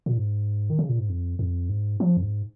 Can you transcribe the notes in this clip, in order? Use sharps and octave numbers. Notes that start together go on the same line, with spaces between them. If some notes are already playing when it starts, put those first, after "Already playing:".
A#2
G#2
D#3
C#3
A#2
G#2
F2
F2
G#2
F3
F2
G#2